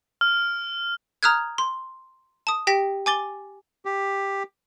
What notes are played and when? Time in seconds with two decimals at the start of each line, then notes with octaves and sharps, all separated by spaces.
0.21 F6
1.23 A#5 D#6 F6 F#6 G#6
1.58 C6
2.47 A5 D#6
2.67 G4 G5 A#6 B6
3.06 G#5 D6 A6 G7
3.85 G4